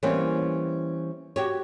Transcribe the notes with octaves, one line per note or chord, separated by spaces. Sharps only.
E3 G3 A#3 C4 C#4
F#4 G4 C#5